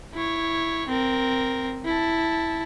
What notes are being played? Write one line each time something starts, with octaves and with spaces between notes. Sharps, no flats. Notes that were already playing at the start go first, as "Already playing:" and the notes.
E4 C#5
C4 A#4
E4 A5